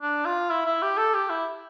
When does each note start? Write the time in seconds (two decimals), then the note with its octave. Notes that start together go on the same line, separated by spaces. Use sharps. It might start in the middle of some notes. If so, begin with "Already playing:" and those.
0.02 D4
0.25 F4
0.50 E4
0.66 E4
0.82 G4
0.97 A4
1.14 G4
1.30 E4